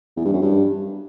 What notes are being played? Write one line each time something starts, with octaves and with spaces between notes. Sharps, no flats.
E2
G2
F#2
G2